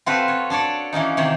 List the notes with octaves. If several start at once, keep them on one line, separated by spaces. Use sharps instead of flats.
C4 F4 F#4 A4 B4
C#5
D4 A4 C#5 D5
E3 A#3 C#4 D#4
C3 D#3 E3 C#5